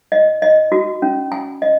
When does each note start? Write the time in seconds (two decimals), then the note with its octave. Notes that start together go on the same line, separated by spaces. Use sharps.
0.12 D#5
0.42 D#5
0.72 F#4
1.02 C#4
1.32 G#5
1.62 D#5